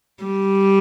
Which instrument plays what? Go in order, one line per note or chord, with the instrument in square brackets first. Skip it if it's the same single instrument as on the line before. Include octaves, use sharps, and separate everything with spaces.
[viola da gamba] G3